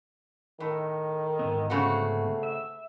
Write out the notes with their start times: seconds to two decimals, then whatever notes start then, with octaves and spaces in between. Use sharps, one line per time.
0.60 A2 D#3
1.39 G#2 D3 B3
1.70 C#3 A3 C4 F#4
2.43 E5